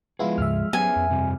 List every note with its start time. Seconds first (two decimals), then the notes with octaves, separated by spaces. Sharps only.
0.19 F3 G#3 B3 E4 F4 G#4
0.38 D2 G#2 C#3 E5 F6
0.73 F#3 B3 C#4 G#4 G#5
0.96 F2
1.10 G2 C3 G3